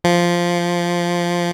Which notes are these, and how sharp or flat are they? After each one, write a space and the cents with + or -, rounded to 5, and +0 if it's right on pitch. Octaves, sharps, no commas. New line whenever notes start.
F3 -5